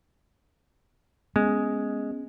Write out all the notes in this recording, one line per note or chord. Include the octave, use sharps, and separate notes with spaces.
G#3 B3 C#4